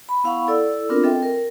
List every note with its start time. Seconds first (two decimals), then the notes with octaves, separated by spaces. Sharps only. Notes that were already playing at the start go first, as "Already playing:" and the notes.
0.09 B5
0.24 B3 E4 F5 F#5 B5 C#6
0.48 E4 A4 D5 E6
0.89 B3 C4 D4 F4 A#4
1.03 C4 A4 D#5 E5 G5
1.23 A#4